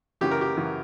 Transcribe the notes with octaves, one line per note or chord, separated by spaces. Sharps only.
F#2 C#3 E3 G4
A#4
G4
F#2 C#3 E3